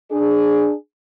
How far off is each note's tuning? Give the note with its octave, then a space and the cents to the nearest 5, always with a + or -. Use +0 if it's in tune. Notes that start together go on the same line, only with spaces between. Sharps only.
D4 +15 G#4 +0